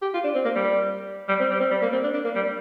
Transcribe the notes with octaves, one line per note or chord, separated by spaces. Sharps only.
G4
F4
D4
C4
A#3
G3
G3
C4
G3
C4
G3
A#3
C4
D4
D4
A#3
G3